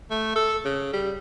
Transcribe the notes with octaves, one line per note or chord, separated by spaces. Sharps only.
A3
A4
C#3
G3